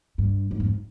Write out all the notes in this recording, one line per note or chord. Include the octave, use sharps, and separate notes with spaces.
G2
G#2
F2